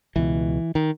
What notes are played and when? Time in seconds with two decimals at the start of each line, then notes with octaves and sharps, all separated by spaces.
0.16 C#2 B2 E3
0.75 D#3